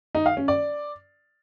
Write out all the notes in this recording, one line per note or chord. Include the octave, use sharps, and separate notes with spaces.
D#4
F5
C#4
D5